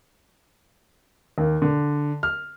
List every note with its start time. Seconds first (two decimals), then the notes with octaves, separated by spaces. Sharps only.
1.38 D#2
1.62 D3
2.23 F6